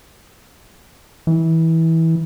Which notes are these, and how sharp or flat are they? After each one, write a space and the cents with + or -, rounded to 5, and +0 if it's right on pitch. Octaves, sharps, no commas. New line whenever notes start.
E3 -20